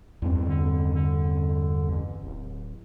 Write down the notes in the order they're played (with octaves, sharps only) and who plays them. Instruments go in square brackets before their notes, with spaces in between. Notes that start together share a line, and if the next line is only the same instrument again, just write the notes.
[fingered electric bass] E2 G2 C4
[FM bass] D3
D3
A1
D1